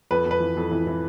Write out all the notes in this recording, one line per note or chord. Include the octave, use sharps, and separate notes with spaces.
F2 B4
F2
B4
E3
F2
E3
E3